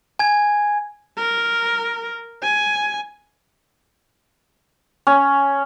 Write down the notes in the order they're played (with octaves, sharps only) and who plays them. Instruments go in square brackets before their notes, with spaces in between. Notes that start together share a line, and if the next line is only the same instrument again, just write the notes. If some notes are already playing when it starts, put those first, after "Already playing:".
[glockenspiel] G#5 G#6
[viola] A#4
G#5
[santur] C#4